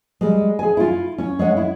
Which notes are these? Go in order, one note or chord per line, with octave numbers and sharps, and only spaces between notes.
G3 G#3
G#4 G#5
E4 F4
C#4
G#3 C#5 F#5
E4